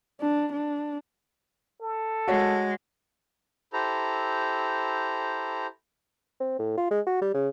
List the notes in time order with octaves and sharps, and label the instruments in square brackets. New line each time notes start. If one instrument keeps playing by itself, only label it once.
[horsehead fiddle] D4
D4
[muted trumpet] A4
[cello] G#3 [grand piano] F#4 C#5
[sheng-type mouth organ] E4 G4 A4 C5 A#5
[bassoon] C4
A2
F4
G#3
F#4
G3
C#3